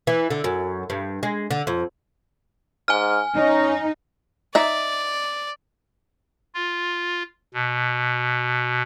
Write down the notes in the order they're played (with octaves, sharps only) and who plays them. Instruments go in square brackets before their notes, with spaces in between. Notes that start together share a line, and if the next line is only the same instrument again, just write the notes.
[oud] E3
D3
F#2
G2
G#3
D3
F2
[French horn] G#2 [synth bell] G#5 F6
[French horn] C#4 [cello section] D#4
[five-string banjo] D#4 E5 [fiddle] D5
[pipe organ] F4
B2